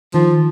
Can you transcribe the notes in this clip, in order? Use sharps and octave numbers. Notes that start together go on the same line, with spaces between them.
D#3 F3